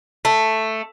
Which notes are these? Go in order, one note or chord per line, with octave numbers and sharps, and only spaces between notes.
A3